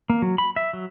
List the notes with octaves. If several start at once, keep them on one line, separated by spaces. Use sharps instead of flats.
A#3
F#3
B5
E5
F#3